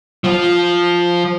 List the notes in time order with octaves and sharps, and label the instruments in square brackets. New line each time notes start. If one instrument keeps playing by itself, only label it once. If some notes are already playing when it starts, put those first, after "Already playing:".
[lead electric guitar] F3 F4